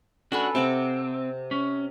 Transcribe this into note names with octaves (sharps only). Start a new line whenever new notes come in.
C#4 D4 F#4 A4 B4
C3 C4 F#5 D6
C#4